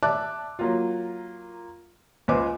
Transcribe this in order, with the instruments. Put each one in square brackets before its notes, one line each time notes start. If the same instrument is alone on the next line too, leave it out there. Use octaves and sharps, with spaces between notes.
[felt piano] D5 E5 A5 D6 F#6
F#3 A#3 F4
C#2 F4 B4 C5 G#5 D6